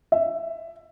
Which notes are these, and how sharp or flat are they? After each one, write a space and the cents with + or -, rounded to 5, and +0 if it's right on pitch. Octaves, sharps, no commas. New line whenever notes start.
E5 +15